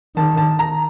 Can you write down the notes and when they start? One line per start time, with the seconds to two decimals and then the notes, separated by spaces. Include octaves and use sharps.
0.16 D#3 A5
0.37 A5
0.59 A#5